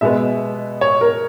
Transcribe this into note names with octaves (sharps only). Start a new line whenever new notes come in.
B2 G#3 B3 E5
C#5
A#4